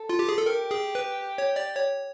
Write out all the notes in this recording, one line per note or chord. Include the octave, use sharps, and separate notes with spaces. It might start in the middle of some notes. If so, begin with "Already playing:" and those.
Already playing: A4
F4
G4
G#4
A4
G4 A#4
G#4
B4
C#5
D5
C#5